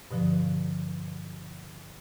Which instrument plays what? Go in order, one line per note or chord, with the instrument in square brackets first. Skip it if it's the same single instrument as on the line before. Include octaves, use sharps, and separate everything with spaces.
[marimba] G2 B2 D3 F3